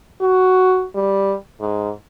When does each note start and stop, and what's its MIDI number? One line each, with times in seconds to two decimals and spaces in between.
0.21 0.85 66
0.95 1.35 55
1.61 1.90 44